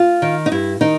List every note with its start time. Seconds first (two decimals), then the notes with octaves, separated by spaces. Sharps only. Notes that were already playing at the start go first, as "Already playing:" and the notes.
Already playing: F4
0.22 D#3
0.46 D#4
0.52 G2 E4
0.81 D#3 D#4